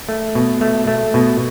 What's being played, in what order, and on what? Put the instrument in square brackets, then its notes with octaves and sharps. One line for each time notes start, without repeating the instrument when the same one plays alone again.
[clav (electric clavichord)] A3
B2
A3
A3
B2